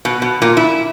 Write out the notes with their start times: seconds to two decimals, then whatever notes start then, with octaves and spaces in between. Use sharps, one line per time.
0.05 B2
0.22 B2
0.42 A#2
0.57 E4